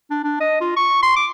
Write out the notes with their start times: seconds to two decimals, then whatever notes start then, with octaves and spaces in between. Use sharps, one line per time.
0.11 D4
0.24 D4
0.40 D#5
0.61 F4
0.77 C#6
1.03 C6
1.16 D6